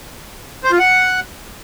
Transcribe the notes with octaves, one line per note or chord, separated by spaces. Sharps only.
C5
F4
F#5